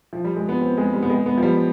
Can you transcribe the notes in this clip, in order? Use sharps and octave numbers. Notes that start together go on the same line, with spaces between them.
F3
G3
G#3
B3
C4
G#3
G3
B3
G#3
B3
F3
G3